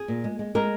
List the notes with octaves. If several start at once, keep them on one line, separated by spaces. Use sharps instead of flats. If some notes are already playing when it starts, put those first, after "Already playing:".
Already playing: G#4
A#2
G#3
G#3
G#3 A#4